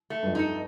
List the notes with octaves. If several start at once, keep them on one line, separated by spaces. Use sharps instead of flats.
A3
G2
F2
D#4 A4